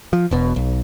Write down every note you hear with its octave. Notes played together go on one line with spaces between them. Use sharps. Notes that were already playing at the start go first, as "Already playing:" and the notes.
F3
E1 B2
B1